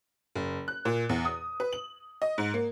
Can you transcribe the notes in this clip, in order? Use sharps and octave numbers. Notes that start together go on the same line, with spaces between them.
F#1
F#6
A#2
E2
D#6
B4
F#7
D#5
G#2
A#3